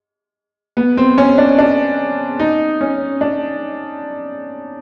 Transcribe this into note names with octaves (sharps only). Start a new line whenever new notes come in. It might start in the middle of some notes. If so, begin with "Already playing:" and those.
B3
C4
C#4
D4
D4
D#4
C#4
D4